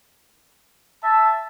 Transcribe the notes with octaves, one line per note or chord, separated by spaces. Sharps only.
E5 A5